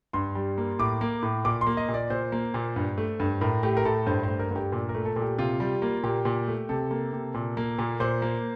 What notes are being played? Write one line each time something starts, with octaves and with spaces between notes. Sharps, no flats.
G2 C6
G3
A#3
A2 D6
A#3
A2
A#2 D6
C6
A#3
D#5
A#2
D5
A#2 C5
A#3
A#2
G2
A3
G2
A2 A#4
A3 G4
A#4
A2 A4
G2 C5
C5
A3
A#4
G2 G4
A#2
A#4
A3
A4
A#2
G4
C3 F4
G3
A#3
A#2 G4
A#2
A3
C3 A4
A#3
C3
A#2
A#3
A#2
A#2 C5
A#3